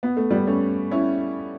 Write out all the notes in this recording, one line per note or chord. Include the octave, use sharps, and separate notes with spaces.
B3
A3
G3 B3
A3 C#4
C#4 E4